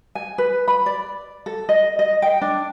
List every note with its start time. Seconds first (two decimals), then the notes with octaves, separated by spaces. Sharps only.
0.15 G#5
0.38 B4
0.68 B5
0.86 D5
1.46 A4
1.69 D#5
1.99 D#5
2.22 G5
2.41 D4